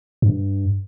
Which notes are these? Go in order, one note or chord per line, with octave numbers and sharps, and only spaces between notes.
G2